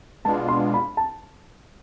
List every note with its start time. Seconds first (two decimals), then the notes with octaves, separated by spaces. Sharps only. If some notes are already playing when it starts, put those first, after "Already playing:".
0.25 B2 G#3 B3 D4 F4 A5
0.48 C6
0.74 B5
0.97 A5